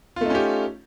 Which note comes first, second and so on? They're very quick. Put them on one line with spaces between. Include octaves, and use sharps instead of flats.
F4 A3 D#4 C#4 G4